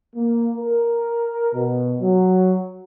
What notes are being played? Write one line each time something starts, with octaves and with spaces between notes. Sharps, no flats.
A#3
A#4
B2
F#3